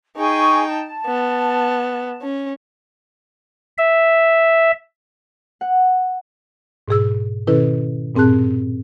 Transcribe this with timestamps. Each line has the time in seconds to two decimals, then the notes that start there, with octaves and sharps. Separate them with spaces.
0.17 D#4 G#4 G5 G#5 C#6
0.66 A5
1.06 B3
2.22 C#4
3.78 E5
5.61 F#5
6.88 G#2 B2 G#4 E6
7.47 B2 D#3 C#4 E4 A4 B4
8.15 G2 A#2 C4 G#4 A5 F#6